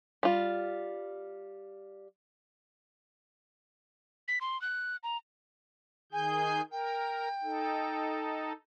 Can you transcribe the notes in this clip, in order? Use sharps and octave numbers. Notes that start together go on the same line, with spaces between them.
G3 F4
B6
C6
F#6
A#5
D#3 G#4 G#5 G6
A#4 G5
D#4 A4